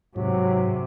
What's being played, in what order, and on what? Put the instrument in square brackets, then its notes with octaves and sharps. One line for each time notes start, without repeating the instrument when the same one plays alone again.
[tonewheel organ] G#2 [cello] C3 [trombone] F#3